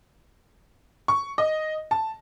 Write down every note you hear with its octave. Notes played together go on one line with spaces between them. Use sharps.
C#6
D#5
A5